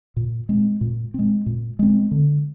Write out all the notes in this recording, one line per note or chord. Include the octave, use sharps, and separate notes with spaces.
A#2
G#3 C4
A#2
G#3 C4
A#2
G#3 C4
D3